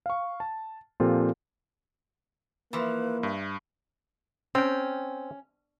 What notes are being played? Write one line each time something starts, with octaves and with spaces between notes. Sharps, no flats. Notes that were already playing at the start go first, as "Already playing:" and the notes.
F5 C#6
A5
A#2 F3 C4 F4 G4 A4
E3 F3 A#3 B4
G2 E5
C4 C#4 G5